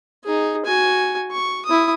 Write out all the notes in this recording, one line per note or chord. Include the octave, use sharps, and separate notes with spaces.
D#4 G#4
F#4 G#5
C#6
E4 D#6